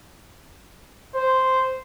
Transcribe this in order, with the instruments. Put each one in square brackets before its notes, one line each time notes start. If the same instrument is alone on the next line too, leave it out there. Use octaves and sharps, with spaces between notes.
[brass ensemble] C5